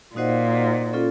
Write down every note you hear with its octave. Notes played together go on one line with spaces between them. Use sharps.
A#2 D#4 F#4 C5 D#5 F#5
C#4 F4 A4